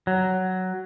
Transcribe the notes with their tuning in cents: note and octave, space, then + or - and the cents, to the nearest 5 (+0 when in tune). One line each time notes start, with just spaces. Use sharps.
F#3 +10